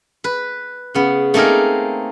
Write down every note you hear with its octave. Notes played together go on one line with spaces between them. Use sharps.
B4
C#3 B3
A3 A#3 C4 D#4 G#4 A#4